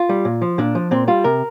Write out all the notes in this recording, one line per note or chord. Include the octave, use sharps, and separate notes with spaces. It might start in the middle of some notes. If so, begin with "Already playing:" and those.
Already playing: F4
G3
A#2
F3
A#2 D4
F3
A#2 C4
G3 F4
C3 A#4